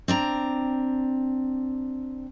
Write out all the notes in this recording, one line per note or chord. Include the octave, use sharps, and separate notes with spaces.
C4 D4 A#5